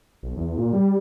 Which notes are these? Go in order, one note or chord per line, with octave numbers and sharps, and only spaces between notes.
B1
E2
A#2
G3